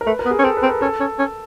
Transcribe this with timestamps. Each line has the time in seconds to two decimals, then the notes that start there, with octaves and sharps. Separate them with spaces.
0.01 A#4
0.06 A3 B4
0.19 A#4
0.25 B3
0.31 G#4
0.39 C#4
0.44 C4 A4
0.57 B4
0.63 C4
0.69 A#4
0.81 C#4 A4
1.00 C#4
1.19 C#4